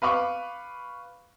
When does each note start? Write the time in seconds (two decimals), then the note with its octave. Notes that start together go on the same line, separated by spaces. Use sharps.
0.02 B4 F5 B5 C#6 D6